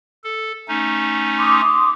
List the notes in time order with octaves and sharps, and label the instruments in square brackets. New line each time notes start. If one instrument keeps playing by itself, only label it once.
[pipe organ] A4
A3 C#4 D#4
[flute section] C6 D6 D#6